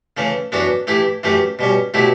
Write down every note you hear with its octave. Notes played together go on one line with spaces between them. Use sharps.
C#3 E3 A3 C#4
F#2 E3 B3 D4 F#4
E3 A3 E4 G4
F#2 E3 A3 C#4 G4
B2 G3 C#4
B2 F#3 A3 E4 G4